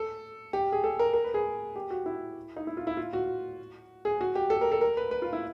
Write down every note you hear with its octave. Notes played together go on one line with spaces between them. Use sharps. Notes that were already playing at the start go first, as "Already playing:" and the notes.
Already playing: A4
G4
G#4
A4
A#4
A#4
B4
G#4
G4
F#4
E4
D#4
E4
F4
E4
F4
F#4
G#4
F#4
G4
A4
A#4
A4
A#4
B4
B4
F4
E4